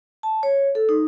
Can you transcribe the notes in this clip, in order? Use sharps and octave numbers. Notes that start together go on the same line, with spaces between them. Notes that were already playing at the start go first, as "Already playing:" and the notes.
A5
C#5
A4
D#4